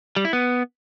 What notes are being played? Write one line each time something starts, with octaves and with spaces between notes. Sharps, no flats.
G3
E4
B3